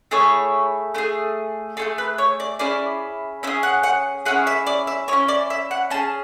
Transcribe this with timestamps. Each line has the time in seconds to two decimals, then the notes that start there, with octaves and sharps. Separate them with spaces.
0.11 A3 E4 G#4 C#5
0.95 A3 E4
0.98 G#4
1.77 A3 E4 G#4 A4
1.98 B4
2.18 C#5
2.40 D5
2.59 C#4 E4 G#4 D5
3.43 C#4 E4 E5
3.47 G#4
3.63 F#5
3.83 F#5
4.26 C#4 E4 G#4 F#5
4.47 E5
4.67 D5
4.87 E5
5.08 C#4 E4 G#4 C#5
5.28 D5
5.50 E5
5.71 F#5
5.90 C#4 A5
5.94 G#4